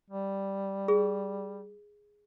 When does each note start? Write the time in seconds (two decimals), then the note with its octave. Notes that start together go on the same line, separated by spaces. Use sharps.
0.10 G3
0.88 G#4